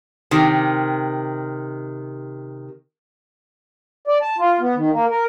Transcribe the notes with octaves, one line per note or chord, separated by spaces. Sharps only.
C3 D#3
D5
A5
F4
B3
D#3
A#3
A#4